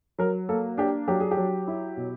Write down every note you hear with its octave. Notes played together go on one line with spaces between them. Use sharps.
F#3 A#4
A#3 A4
D4 G4
F#3 G4
G#4
G4
F#3
E4
B2